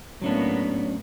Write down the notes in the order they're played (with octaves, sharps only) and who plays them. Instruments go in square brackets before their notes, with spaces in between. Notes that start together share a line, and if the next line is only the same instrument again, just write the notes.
[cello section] A2 A#3 B3 [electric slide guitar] F#3 C#4 D4